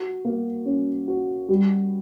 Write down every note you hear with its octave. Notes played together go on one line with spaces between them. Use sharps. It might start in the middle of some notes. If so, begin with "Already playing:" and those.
Already playing: F#4
A#3
C#4
F#4
G3